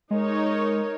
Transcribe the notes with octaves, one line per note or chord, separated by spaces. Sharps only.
G#3 D#4 A#4 C#5